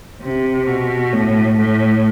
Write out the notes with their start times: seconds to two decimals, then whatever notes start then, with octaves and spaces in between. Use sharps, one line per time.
0.22 C3
0.67 B2
1.12 A2
1.57 A2